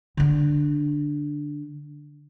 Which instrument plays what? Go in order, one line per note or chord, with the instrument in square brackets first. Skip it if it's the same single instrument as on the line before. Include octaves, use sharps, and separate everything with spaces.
[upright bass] D3 D4